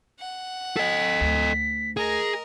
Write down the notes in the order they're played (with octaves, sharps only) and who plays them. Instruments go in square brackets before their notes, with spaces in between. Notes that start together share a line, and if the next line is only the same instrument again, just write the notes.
[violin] F#5
[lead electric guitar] A4 D#5 [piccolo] B6
[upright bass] D2
[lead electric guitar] G#4 [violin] A#4 D#5